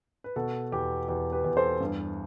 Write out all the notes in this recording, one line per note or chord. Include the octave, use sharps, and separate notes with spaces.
B4
B2 F#4 A4
E2 G4
E2 G4
G4 B4
E2
A4 C5
G2